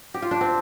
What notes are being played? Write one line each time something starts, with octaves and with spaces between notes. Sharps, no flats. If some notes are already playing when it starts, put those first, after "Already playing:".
G4
F4
D4
C4